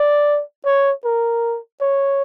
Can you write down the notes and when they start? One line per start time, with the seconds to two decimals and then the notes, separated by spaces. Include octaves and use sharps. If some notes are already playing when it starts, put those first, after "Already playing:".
Already playing: D5
0.65 C#5
1.05 A#4
1.81 C#5